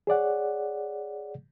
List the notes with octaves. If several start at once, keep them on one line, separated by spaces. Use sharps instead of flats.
G#4 C#5 D5 F#5